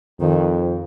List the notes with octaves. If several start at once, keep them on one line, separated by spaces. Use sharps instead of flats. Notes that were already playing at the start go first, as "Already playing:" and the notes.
F2 D#3